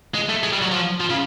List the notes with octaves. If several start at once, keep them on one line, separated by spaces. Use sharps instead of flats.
G#3
A3
G#3
G3
F#3
F3
F3
C#3